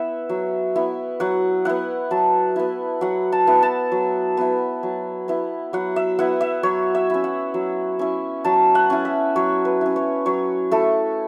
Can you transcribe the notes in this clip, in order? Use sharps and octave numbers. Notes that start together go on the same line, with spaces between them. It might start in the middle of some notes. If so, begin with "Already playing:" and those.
Already playing: B3 E4 E5 F#5
F#3
B3 E4
F#3 F#5
B3 E4 F#5
F#3 A5
B3 E4
F#3 F#5
A5
B3 E4
A5
F#3
B3 E4
F#3
B3 E4
F#3 F#5
E5
B3 E4 F#5
E5
F#3 C#5
E5
C#4 E4
F#5
F#3
C#4 E4
F#3 A5
F#5
C#4 E4
E5
F#3 C#5
B4
C#4 E4
C#5
F#3 C#5
A3 E4 A4